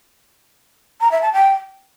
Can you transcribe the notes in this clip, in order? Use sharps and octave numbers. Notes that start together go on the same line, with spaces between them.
A#5
E5
A5
G5